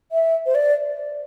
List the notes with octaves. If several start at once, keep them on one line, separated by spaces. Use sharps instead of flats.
E5
C5
D5